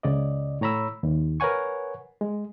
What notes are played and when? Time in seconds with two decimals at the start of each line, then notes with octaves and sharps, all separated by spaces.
0.03 C#2 C#3 D5 D#5
0.61 A2 C#5 A#5 B5 E6
1.03 D#2
1.40 A#4 B4 C#5 F#5 G#5 C#6
2.21 G#3